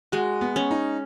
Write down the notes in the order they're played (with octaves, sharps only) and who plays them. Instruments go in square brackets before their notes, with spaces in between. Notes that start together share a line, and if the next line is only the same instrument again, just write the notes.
[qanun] G#3 [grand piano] F#4
[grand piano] B3
[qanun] C#4
[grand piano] D#4